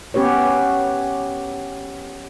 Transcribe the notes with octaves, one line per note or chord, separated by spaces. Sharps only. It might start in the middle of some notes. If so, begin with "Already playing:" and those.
B3 C#4 G4 B4 C#5